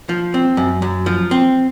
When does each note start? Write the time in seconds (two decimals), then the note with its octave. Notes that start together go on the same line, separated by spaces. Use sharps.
0.09 F3
0.34 C4
0.57 F#2
0.82 F#2
1.06 F3
1.31 C4